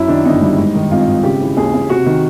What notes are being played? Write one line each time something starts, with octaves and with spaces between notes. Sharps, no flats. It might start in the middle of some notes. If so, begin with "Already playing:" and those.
Already playing: F#2 E4
D#3 D4
G1 D#4
G3
G#2
D#3
G#1 F4
G#1
C#3 G4
E3
D#2 G#4
D#2
C3 F#4
D#3